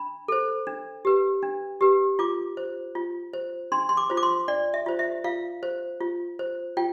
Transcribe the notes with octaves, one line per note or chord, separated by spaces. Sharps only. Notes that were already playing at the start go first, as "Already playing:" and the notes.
Already playing: D4 B5
A4 C5
D4
G4 B4
D4
G4 B4
F4 D6
C5
F4
C5
D4 C6
C6
D6
F4 C5
D6
C6
D4 D5
E5
F4 C5
E5
F4 F5
C5
F4
C5
F4 G5